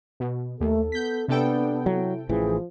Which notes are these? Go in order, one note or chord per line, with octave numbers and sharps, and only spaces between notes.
B2
D#2 A3 A4
B3 G6 B6
C3 B3 D4 A4 G5
F#3 E4
A1 E3 F3 G#4